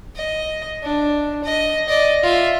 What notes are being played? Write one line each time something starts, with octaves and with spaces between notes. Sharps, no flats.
D#5
D4
D#5
D5 D#5
F4 E5